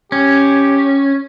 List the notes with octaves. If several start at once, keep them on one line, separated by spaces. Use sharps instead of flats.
C#4 G4